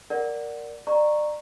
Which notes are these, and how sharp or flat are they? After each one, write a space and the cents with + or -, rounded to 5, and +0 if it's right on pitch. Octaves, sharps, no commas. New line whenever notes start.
A#4 +0 D5 +0 F#5 +0
D5 +30 A#5 +0 C#6 -10